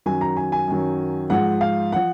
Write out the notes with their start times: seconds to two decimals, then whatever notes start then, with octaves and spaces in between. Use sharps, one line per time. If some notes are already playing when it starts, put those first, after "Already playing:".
0.06 F#2 D#3 F#3 G#5
0.21 A#5
0.37 G#5
0.52 G#5
0.68 F#2 D#3 F#3
1.30 G#2 F3 F#5
1.61 F5
1.92 F3 F#5